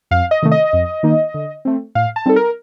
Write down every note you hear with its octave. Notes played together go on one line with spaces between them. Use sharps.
F2 F5
D#5
C3 D#3 A3
D#5
F2
D#3 A#3 D#4
D3
A3 C4
A2 F5
A5
G3 C4 D#4 A4
A#4